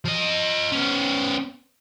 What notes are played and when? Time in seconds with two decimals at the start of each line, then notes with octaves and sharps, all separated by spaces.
0.05 F3 D#5
0.72 B3 C#4